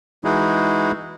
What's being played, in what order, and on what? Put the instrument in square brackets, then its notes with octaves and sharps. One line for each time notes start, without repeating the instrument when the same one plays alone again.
[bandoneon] E3 G#3 D#4 E4 F#4 G#4